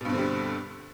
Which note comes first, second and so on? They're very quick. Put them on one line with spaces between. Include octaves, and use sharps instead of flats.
B2 G2 C4 D3 G3